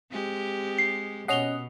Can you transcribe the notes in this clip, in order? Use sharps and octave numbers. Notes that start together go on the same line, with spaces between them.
G#3 C4 G4
C7
B2 C#4 D#5 F#5 C7 F7 G7